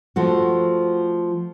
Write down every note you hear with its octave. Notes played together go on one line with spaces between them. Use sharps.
F3 A3 F#4